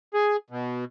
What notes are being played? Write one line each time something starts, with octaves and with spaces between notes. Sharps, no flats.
G#4
B2